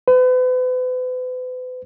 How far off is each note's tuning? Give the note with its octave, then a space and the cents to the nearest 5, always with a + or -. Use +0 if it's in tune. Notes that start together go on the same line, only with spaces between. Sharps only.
B4 +40